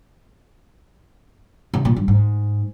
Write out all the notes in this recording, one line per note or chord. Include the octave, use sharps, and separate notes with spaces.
C3
A#2
G2
G#2